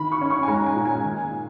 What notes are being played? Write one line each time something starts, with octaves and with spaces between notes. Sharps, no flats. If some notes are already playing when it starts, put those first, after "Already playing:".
Already playing: D#3 B5
C#6
C#4
C#6
G#5
G#3 A#5
G#5
A#2
G#5
D#3